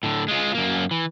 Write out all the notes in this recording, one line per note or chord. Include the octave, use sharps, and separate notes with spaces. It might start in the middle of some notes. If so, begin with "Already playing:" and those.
A2 D3
G#3 F4
F#2 A#3
E3